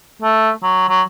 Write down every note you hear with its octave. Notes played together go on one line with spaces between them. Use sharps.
A3
F#3
F#3